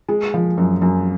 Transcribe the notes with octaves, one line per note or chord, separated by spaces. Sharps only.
G#3
F3
F#2
F#2